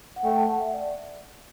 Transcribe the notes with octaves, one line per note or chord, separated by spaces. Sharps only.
F#5
A3 G5
A5
F#5
E5
D5